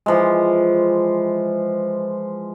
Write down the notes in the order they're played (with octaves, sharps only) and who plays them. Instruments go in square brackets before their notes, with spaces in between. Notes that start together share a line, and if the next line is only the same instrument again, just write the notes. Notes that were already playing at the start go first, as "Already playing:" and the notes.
[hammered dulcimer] E3 F3 G#3